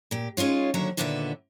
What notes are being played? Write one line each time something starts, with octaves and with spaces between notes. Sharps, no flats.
A#2 G4
G#3 C#4 D#4 F4 C#5
D#2 D3 F#3 C#5 E5 A#5
D#2 A#2 D3 B3 G#4 E5